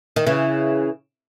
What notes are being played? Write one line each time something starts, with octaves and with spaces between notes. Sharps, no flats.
D#3
C#3 E3